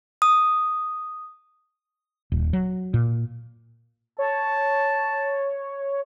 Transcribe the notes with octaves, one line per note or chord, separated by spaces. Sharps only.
D#6
D#1
F#3
A#2
C#5 A5